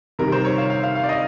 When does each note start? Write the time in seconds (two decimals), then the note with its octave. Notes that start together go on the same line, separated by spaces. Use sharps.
0.19 C3 D#3 G3 A#4
0.32 C5
0.45 C#5
0.58 F5
0.70 F5
0.83 F5
0.95 F5
1.04 D5
1.09 D#5